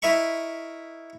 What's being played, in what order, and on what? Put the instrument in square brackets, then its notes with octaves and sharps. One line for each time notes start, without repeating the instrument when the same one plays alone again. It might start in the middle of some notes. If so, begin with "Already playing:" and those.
[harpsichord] E4 A#4 D#5 E5 B5 C#6